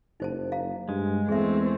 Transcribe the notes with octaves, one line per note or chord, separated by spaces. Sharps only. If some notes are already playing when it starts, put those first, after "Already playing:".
F#1 D#4 C5 A5
F5 A#5
G2 G#3
E2 A3 C4 G#4 E5